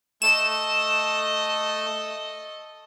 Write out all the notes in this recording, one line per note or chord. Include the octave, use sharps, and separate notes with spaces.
A3 A4 D#5 E7